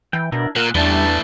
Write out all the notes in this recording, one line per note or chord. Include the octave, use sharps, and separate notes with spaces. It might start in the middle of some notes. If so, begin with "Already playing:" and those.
E3 G5
B2 D4 E4 A#4
A#2 A#4 F#5
E2 E3 G3 A3 D4 G5 A5